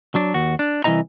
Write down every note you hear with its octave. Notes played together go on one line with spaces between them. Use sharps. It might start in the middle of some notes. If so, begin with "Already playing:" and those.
F#3 D4
D#2 F#4
D4
C2 E3 A3 E4 D#5 A#5